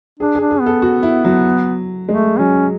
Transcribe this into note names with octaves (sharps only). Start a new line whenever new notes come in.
D4 G#4
G#4
D4
G#4
B3
A4
F#4
E4
F#3
G#3 A3
F#3 C#4